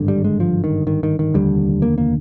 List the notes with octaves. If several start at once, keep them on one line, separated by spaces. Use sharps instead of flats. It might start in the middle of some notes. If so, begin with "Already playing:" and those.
Already playing: G#1 G2 D3
G3
G#3
F3
D#3
D#3
D#3
D#3
F1 D#2 D3 G3
A#3
A#3